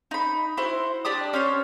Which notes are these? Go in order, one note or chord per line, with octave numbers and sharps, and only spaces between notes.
D#4 B5
E4 F#4 C5
D4 G4 A5 D#6
C#4 C5 C#5